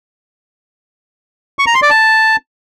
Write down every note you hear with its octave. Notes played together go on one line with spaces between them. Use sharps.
C#6
A#5
C6
D5
A5